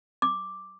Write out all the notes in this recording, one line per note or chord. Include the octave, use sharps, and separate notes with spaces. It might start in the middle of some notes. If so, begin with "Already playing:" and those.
D6